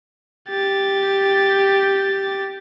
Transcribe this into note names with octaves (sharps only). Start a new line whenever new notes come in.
G4 A6